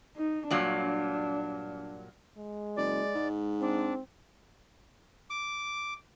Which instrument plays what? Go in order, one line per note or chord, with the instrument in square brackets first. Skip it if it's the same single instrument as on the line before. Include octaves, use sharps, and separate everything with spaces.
[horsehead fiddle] D#4
[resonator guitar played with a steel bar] G2 A#2 F#3 [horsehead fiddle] D4
[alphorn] G#3
[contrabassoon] F#1 [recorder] D5
[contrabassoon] G#2
[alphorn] C4 [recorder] D4
[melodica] D6